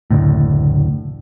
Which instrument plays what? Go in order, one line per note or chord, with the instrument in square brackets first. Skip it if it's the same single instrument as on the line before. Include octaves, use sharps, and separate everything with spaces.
[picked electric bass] F#1 D2 A2